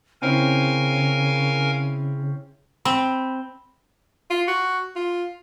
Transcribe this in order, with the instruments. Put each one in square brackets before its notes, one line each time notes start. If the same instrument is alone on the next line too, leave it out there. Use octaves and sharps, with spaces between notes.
[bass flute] C#3 [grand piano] C4 C#4 E4 [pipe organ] A#4 F5 G#5
[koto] C4 [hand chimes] B5
[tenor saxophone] F4
F#4
F4